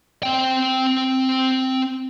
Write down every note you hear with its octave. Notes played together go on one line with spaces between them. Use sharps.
C4 G5